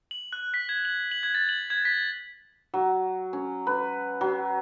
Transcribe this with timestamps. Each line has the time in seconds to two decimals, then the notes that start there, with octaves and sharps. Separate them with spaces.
0.11 F#7
0.33 F#6
0.54 B6
0.69 G#6
0.85 F#7
1.11 F#7
1.23 G#6
1.35 A6
1.49 F#7
1.70 G#6
1.85 B6
2.74 F#3
3.33 C#4
3.67 B4
4.21 F#3